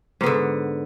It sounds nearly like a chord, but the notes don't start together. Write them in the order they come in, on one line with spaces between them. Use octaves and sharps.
G#2 B3 D3